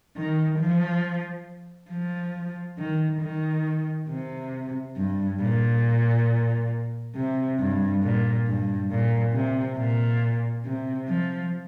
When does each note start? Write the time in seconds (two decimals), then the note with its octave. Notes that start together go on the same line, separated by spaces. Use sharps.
0.16 D#3
0.59 F3
1.90 F3
2.78 D#3
3.21 D#3
4.09 C3
4.97 G2
5.41 A#2
7.15 C3
7.59 G2
8.03 A#2
8.46 G2
8.90 A#2
9.33 C3
9.76 A#2
10.65 C3
11.09 F3